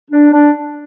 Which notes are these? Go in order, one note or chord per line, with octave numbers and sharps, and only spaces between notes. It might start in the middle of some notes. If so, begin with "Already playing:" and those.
D4
D4